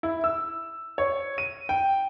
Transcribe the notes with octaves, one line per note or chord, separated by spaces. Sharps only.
E4
E6
C#5
D#7
G5